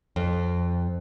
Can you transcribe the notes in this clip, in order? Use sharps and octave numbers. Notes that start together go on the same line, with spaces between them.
F2